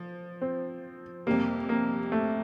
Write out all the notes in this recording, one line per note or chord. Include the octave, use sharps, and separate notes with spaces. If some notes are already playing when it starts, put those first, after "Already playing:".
Already playing: F3
C4
F2 C3 G3 A#3
A#3
A3